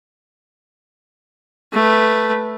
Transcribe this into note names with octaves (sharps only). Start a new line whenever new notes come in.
A3 B4